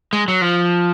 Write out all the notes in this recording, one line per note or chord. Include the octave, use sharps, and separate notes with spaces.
G#3
F#3
F3